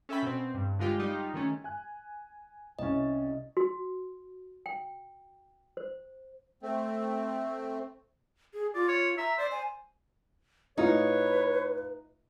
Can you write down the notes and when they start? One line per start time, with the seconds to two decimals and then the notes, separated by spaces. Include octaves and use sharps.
0.09 C#4 A4 E5 G5 B5
0.23 B2 C4
0.54 G2
0.79 D3 G#3 F4 G4
0.99 G3 D#4 F4 G4
1.34 D#3 A3 C#4
1.64 G#5 F#6
2.79 C2 C3 C#4 D#5
3.57 F#4
4.66 G5
5.77 C5
6.63 A3 C4
8.54 G#4
8.75 F4 D5
8.88 C#5
9.18 E5 A#5
9.38 C5 D5
9.52 G#5
10.78 A2 D#4 F4 B4 C#5